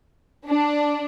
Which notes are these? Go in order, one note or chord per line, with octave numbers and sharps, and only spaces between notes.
D4